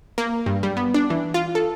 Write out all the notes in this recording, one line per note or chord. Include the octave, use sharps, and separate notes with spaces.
A#3
G2
G3
B3
D4
E3
F4
A4